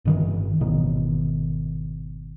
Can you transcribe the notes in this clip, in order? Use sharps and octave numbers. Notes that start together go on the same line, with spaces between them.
G1 D#3 E3
G#1 B2 D#3